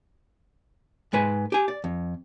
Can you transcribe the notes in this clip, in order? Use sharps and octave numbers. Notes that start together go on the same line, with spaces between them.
G#2 G#3 B4 G#5
G4 G#5
D5
F2